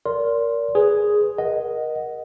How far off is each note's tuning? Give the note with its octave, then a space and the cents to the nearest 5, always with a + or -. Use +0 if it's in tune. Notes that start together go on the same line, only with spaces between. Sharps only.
A#4 +0 D5 -35 C6 +0
G#4 +0 B4 +0
A#4 +25 D#5 +0 F#5 +0